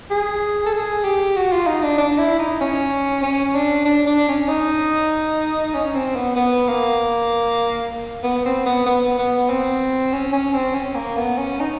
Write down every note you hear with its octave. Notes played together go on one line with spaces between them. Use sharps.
G#4
A4
G#4
G4
F#4
F4
D#4
D4
D4
E4
D#4
C#4
C#4
D4
D4
D4
C#4
D#4
C#4
C4
B3
B3
A#3
B3
C4
B3
B3
B3
C4
C#4
C#4
C4
C#4
A#3
B3
C#4
D#4